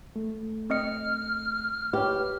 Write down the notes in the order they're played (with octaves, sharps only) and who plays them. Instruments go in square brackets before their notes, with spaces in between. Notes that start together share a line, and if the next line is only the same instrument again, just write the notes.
[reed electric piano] A3
[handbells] C4 D#5 C#7 [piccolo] F6
[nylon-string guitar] G4 [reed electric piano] B4 C#5 [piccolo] F6